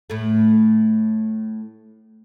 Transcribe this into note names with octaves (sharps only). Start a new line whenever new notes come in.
A2 A3